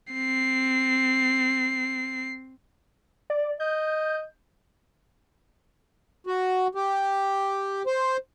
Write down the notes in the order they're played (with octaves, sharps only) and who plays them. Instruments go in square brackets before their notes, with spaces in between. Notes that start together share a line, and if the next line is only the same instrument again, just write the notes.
[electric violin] C4 C7
[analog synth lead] D5
[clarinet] D#5 [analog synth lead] G6
[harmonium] F#4
G4
C5